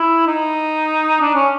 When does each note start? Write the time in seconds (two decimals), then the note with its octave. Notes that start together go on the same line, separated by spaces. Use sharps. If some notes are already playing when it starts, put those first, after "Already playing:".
Already playing: E4
0.27 D#4
1.21 D4
1.35 C#4